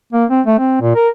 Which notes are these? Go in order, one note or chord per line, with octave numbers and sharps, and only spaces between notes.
A#3
C4
A3
C4
A#2
A#4